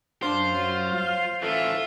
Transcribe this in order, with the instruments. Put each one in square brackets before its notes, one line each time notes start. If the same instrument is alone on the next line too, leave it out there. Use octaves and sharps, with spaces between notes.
[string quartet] F#2 [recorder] D4 [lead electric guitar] F4 [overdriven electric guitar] C5
[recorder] F#3
[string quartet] F5
[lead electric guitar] E3 A3 [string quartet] F4 E5 [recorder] A4